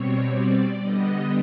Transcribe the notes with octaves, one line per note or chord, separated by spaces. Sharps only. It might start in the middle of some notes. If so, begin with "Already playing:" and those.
Already playing: B2 G3 C4 C#5
D5
D3 G3 B3 D#5